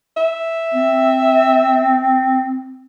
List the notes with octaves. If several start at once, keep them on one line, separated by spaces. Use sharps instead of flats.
E5
C4